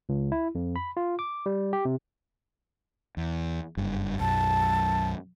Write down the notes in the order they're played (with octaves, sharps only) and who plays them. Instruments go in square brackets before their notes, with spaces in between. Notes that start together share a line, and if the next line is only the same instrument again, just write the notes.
[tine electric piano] C#2
E4
F2
B5
F4
D6
G3
G4
C3
[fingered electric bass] E2
F#1 G2
[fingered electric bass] B1 F#2 [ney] A5